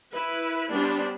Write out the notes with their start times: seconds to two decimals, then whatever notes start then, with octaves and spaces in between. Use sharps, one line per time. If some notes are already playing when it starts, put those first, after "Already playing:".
0.12 E4 B4
0.69 G3 B3 C#4 D4 C5